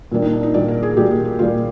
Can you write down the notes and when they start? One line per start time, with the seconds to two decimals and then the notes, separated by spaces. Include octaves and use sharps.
0.12 A#2 G3 A#3 D4
0.22 D#4
0.34 D4
0.43 D#4
0.54 A#2 G3 A#3 D5
0.68 A#4
0.83 G#4
0.97 A#2 G3 A#3 G4
1.11 G#4
1.25 G#4
1.39 A#2 G3 A#3 F4